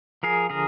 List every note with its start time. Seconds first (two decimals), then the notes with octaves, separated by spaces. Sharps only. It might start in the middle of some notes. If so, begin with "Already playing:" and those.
0.23 F3 G#4 A#4
0.50 D3 G#4 A#4